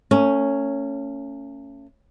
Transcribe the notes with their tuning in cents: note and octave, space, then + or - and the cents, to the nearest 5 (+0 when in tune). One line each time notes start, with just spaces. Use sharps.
A3 +40 C#4 +0